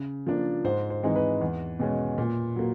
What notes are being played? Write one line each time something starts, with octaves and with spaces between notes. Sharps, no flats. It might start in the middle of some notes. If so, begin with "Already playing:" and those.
Already playing: C#3
F3 A#3 D4
G#2 C5
C5
E3 G#3 C4 D#4
B4
E2
B2 G#3 C#4
A#2
F#3 A#3